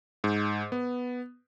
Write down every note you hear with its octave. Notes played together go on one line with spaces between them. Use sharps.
G#2
B3